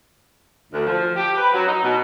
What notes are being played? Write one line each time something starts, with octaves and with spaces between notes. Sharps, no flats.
D2
F3
G4
B4
F#3
D#4
B2